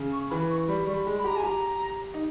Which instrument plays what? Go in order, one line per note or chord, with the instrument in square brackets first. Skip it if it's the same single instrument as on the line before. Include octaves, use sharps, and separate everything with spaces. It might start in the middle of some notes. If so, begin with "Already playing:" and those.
Already playing: [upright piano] C#3
[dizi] C#6
[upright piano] E3 [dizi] B5
[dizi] C#6
[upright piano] G3 [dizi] B5
[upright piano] G3 [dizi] C#6
[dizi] B5
[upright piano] G#3
[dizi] B5
[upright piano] G4 [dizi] A#5
[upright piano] G#4 [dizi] G#5
[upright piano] G4 [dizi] A#5
[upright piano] D#4